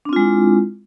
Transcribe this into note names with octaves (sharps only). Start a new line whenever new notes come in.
G#3 C4 D4 E4 F4